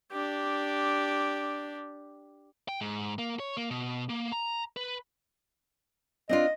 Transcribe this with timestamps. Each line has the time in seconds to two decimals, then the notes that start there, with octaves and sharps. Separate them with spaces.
0.11 D4 G4
2.68 G5
2.81 G#2
3.19 A#3
3.39 C#5
3.57 A#3
3.70 B2
4.09 A#3
4.32 A#5
4.77 B4
6.29 C4 D4 F4 D#5